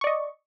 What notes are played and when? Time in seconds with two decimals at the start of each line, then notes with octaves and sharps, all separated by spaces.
0.01 C#6
0.04 D5
0.07 D#5